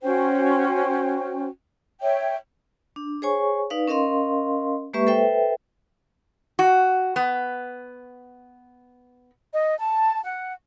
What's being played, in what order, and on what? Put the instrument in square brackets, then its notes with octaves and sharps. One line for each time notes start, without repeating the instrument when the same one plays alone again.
[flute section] C#4 F#4 C5 G5
C#5 E5 G5
[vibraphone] D4
G#4 C5 C#5 G#5 C#6
D#4 B4 D5 F5
C#4 A#4 D#5 F5 C6
G#3 A#3 G4 B4 E5 C#6
A4 B4 C5 E5 G5
[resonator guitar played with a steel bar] F#4
B3
[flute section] D#5
A5
F#5